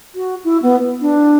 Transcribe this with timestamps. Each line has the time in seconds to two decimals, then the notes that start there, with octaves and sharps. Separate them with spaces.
0.15 F#4
0.44 E4
0.62 B3
1.01 D4